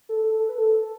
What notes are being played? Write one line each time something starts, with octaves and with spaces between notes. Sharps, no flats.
A4
A4
A4
B4
A4